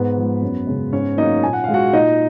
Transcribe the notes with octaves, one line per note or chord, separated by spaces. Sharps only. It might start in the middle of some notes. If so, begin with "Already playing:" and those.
Already playing: G#2 B3 B4
F3 G#3
F#2
C#3 G#3
G#2 C#4 C#5
F#3 A#3 D#4 D#5
A#2 G#5
F#5
G#3 F5
F#4 F#5
A#2 D#4 D#5